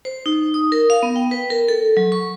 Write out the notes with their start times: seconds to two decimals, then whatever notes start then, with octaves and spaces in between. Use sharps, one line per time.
0.05 C5
0.26 D#4
0.54 D#6
0.72 A#4
0.90 F5
1.03 B3
1.16 G5
1.31 B4
1.50 A#4
1.68 A4
1.97 F#3
2.12 C#6